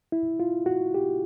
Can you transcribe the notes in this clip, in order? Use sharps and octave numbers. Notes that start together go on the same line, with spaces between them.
E4
F4
F#4
G4